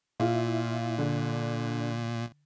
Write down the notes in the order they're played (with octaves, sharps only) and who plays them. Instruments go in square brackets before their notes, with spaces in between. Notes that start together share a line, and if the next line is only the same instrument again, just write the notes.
[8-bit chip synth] A#2 [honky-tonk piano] E4 F4
[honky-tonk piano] D3